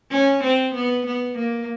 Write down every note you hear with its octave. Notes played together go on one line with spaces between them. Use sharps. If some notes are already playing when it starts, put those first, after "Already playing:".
C#4
C4
B3
B3
A#3